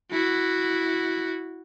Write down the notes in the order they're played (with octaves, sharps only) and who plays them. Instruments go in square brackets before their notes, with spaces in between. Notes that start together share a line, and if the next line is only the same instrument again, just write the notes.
[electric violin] E4 F#4